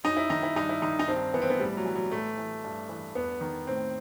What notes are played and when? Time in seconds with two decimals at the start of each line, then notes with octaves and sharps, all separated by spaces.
0.04 F#2 D#4
0.17 E4
0.30 D#3 D#4
0.43 E4
0.56 G2 D#4
0.69 E4
0.82 D#3 D#4
0.99 D#4
1.08 G2 C4
1.34 E3 B3
1.42 C4
1.50 B3
1.60 A2 G3
1.77 F#3
1.86 E3
1.95 F#3
2.12 A2 A3
2.38 E3
2.64 G2
2.89 E3
3.15 E2 B3
3.41 D#3
3.67 A2 C4